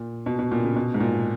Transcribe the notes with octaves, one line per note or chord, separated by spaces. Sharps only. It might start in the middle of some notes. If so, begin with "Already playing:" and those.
Already playing: A#2
B2
B2
A#2
C#3
B2
G#2
A#2